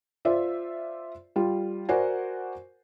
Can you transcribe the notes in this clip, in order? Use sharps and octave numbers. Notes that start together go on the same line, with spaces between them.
F4 C5 D5 E5
G3 F4
F#4 A#4 C5 D5 F#5 G#5